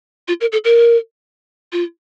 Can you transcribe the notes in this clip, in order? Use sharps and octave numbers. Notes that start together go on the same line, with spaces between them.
F4
A#4
A4
A#4
F4